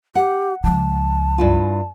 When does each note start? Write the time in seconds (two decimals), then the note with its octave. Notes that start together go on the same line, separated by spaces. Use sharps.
0.15 G4 F#5
0.64 C#2 F3 A5
1.38 G2 E4 F4